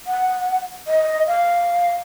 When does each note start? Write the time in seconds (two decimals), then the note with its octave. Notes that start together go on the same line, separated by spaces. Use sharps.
0.07 F#5
0.87 D#5
1.27 F5